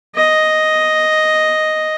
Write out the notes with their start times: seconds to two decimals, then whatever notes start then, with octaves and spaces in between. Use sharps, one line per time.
0.16 D#5